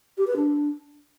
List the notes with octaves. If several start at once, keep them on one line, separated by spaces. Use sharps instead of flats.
G4
B4
D4